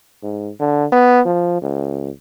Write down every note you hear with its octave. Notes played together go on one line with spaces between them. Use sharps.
G#2
D3
B3
F3
C#2